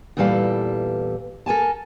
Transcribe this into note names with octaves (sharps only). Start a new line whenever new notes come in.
E2 A#2 E3 G3 A4 F5
A4 A#4 G#5 A5